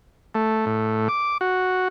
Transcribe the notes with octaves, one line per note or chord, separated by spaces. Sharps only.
A3
A2
D6
F#4